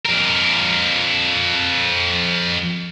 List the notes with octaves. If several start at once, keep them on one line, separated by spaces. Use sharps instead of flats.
F2 A#4